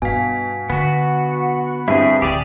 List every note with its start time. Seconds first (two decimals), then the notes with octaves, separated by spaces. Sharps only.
0.02 G2 B2 F5 G#5 B6
0.70 D3 B3 F#4
1.88 G2 C4 E4 G#4 E5
2.22 D2 A2 G4 G#4 D5 D6